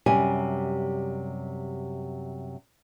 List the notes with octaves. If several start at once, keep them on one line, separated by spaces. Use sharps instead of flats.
F#2 C3 G3 G#5